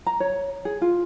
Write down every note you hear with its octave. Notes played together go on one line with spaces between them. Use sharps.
A#5
C#5
G#4
F4